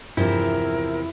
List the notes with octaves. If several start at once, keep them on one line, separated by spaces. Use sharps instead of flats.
E2 G2 C3 F3 E4 A#4